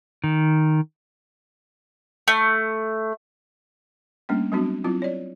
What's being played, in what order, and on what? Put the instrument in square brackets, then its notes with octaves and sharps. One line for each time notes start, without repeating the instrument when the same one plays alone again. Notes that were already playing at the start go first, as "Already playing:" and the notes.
[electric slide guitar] D#3
[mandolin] A3
[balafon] G3 A3 A#3 C#4 D4
F#3 G3 B3 C4 D4 F#4
F#3 C4 E4 F4
C#5 D5